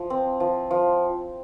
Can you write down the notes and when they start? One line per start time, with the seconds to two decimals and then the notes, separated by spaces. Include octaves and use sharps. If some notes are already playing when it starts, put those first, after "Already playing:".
Already playing: F3
0.10 C4
0.40 F3
0.71 F3